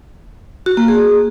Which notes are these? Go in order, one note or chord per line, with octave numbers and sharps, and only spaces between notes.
F#4
A#3
G#4